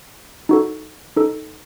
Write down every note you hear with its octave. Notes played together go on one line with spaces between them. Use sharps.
D#4 F#4 A4
D#4 A4